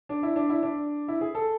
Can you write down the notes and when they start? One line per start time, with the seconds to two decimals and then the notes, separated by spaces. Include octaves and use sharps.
0.09 D4
0.23 E4
0.36 D4
0.49 E4
0.63 D4
1.08 E4
1.21 G#4
1.35 A4